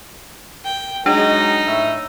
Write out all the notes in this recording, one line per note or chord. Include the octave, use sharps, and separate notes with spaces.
G5
F#3 G#3 D4 D#4
A2 C#5 E5